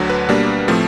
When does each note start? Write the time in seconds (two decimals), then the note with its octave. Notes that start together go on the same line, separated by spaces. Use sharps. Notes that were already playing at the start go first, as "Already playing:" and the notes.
Already playing: D2 D3 F#3
0.09 B4
0.28 B2 G3 A#3 D4
0.68 A2 F3 A3 C4